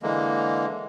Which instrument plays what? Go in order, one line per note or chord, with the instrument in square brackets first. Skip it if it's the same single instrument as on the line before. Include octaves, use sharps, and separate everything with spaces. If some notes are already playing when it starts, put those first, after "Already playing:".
[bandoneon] D3 E3 G#3 A#3